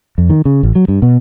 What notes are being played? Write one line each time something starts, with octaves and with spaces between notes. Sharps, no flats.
F2
D#3
C#3
A1
F#3
G2
B2